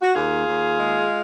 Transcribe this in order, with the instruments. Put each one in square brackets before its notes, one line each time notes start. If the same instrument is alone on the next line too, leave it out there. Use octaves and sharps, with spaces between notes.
[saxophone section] F#4
D#2 F4 G#4
D#2
G#3